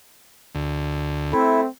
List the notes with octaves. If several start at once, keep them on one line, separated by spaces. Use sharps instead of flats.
D2
A3 C4 E4